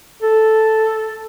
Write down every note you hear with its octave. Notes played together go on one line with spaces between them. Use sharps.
A4